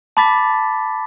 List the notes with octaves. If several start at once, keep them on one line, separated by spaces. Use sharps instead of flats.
A5 B5 D6 A6 B6